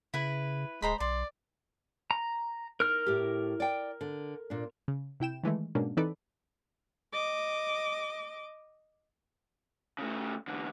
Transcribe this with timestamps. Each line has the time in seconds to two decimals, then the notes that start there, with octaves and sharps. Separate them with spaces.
0.14 C#3 E4 B4
0.82 D1 G#3 C5 A#5 B5
1.00 B1 D5 C6
2.11 A#5
2.80 D#4 A#4 F6
3.06 A2 G4
3.60 D5 G5
4.01 D3
4.50 A#2 D4
4.88 C#3
5.20 C3 E4 G5 E7
5.44 D#3 E3 G#3 A3
5.75 G#2 B2 A#3 C#4 D4
5.97 E3 C4 D#4 A4 B4 D5
7.13 D#5 D6
9.99 C#3 A3
10.47 E2 D3